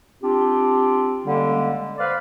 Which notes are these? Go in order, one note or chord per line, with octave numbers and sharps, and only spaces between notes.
C4 D4 F4 G4
D3 G3 G#3 A#3 C#4
B4 C5 D5 F5